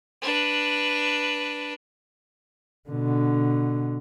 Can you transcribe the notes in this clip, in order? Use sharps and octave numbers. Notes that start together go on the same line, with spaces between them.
D4 B4
B2 D3